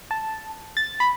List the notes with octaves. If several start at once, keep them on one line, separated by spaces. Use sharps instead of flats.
A5
A6
B5